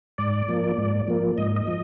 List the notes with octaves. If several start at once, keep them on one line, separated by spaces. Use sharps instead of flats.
G#2 D5
F3 A#3
G#2
F3 A#3
G#2 D#5
D#5
F3